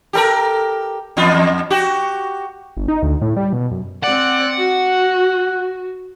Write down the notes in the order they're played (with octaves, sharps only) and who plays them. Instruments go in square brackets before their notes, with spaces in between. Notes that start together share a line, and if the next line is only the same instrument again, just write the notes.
[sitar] G4 A4 A#4
E2 B3 F4
E2
F#4 G4
[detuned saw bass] G1
D#4
D2
A2
G3
B2
F#2
[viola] C4 D5 [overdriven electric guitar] F#5
[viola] F#4